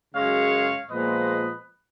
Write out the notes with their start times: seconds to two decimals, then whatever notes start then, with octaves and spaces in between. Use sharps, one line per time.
0.15 F#2 C#3 G#3 C#4 C#5 F5
0.89 A#2 F3 G#3 B3 B4 D#5